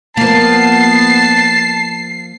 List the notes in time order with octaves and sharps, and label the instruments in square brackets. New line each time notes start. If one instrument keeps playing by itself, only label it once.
[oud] F3 A#3 [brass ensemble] B3 [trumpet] A5 [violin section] C7